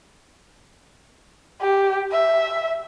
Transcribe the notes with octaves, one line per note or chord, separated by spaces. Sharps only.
G4
E5